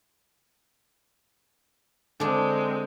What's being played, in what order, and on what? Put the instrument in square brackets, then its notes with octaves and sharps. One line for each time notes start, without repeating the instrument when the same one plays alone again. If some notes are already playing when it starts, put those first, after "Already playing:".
[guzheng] D3 D4 [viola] G#3 C4